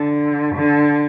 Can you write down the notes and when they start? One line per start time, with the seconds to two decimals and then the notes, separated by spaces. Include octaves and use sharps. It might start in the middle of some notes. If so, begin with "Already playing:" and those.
Already playing: D3
0.55 D3